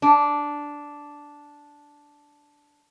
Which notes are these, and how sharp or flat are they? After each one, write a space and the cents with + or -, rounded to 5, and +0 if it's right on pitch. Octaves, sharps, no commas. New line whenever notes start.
D4 -5